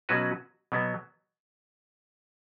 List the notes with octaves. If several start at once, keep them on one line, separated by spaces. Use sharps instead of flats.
B2 F#3 C#4 F#4 B4
B2 F#3 B3